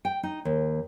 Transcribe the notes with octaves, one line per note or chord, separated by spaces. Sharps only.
G5
D#4
D#2